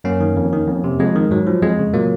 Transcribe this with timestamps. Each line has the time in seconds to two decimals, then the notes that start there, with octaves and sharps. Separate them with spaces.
0.04 F#2 A#3 C#4
0.21 D#3
0.36 F2
0.53 D#3
0.68 F2
0.84 C3
1.00 F2 G#3
1.16 D#3
1.31 G#2 F#3
1.47 F3
1.62 F2 G#3
1.79 C#3
1.94 A#2 F#3 A#3